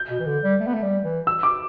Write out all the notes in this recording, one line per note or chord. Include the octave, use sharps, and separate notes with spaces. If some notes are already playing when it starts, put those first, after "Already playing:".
Already playing: G6
B2
E3
D3
G3
A3
B3
A3
G3
E3
E6
D6